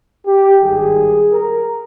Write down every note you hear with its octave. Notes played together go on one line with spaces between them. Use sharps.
G4
G#1 G2 D#3 G3 G#4
A#4